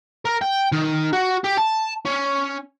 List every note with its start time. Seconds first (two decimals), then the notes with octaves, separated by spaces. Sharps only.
0.25 A#4
0.41 G5
0.72 D#3
1.13 F#4
1.44 G4
1.57 A5
2.06 C#4